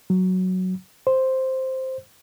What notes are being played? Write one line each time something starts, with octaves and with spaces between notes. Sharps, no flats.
F#3
C5